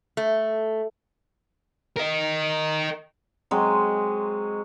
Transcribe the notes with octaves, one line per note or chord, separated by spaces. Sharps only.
A3
A#4 D#5
F#3 G#3 C4 D#5